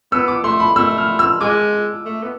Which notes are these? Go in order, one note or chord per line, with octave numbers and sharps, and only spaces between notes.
B3 E6
D6
A3 C6
B5
A3 E6
F6
E6
G#3 D6
A3
B3